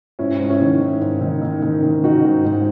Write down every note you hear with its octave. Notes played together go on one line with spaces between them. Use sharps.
G#2 C#4 E4
G#2
C#4 E4
D#3
D#3
G#2
D#3
D#3
D#3
D#3
D#3 D#4 F#4
G#2
G#2